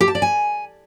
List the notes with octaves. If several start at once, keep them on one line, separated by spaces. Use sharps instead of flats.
G4
A5
D5
G#5